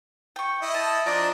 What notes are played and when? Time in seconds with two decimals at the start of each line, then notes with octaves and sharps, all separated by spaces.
0.36 G5 C#6
0.62 E4 D#5
0.74 A5
1.06 F3 D4 D5 D#5 A#5